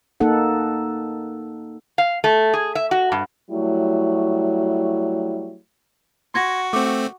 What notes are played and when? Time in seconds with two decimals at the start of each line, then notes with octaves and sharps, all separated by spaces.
0.20 A#3 D#4 A4 F#5
1.98 F5
2.24 A3
2.54 G#4
2.75 E5
2.91 F#4
3.12 G2
3.51 F#3 G3 A3 E4
6.34 F#4 C6 G#6 A#6
6.73 A3 C4 D6